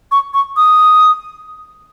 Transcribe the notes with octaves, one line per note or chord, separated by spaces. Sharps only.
C#6
C#6
D#6